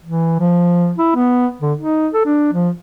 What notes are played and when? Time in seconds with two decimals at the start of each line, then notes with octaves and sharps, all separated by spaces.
0.04 E3
0.40 F3
0.98 E4
1.15 B3
1.61 D3
1.78 D#4
2.13 A4
2.25 D4
2.53 F3